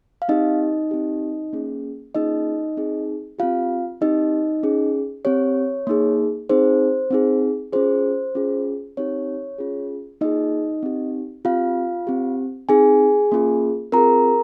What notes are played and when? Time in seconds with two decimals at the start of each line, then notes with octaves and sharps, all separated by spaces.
0.22 F5
0.28 C4 D#4 G4 D#5
0.91 C4 G4
1.53 A#3 C#4 G#4
2.15 A#3 C#4 D#4 F4 G#4 D#5
2.77 C4 D#4 G#4
3.39 C4 F4 G4 F5
4.01 C4 D#4 G4 D#5
4.63 C#4 G#4
5.25 C4 G4 C#5
5.87 A#3 D#4 G#4
6.49 C4 D#4 G#4 C5
7.11 C4 D#4 G#4
7.73 C#4 F4 G#4 C5
8.35 C#4 F4 G#4
8.97 C4 D#4 G4 C#5
9.58 C#4 F4 G#4
10.21 A#3 D#4 F4 G#4 D#5
10.83 C4 D#4 G4
11.45 C4 F4 G4 F5
12.07 C4 G4
12.69 C4 D#4 G#4 G#5
13.32 A#3 C#4 F4 G#4
13.92 C4 F4 G#4 A#4 A#5